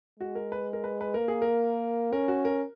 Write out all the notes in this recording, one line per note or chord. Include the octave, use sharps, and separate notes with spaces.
G#3 F#4
A#4
B4
A#4
B4
B4
A#3 A#4
G#4
A#4
C#4 A#4
F#4
A#4